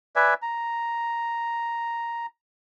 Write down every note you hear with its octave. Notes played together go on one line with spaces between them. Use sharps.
B4 D5 E5 G#5
A#5